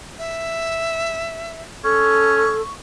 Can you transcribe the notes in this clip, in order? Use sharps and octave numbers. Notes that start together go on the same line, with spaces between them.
E5
C#4 A4 C#6